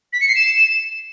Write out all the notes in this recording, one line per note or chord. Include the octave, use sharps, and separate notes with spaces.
B6
C#7
C7
E7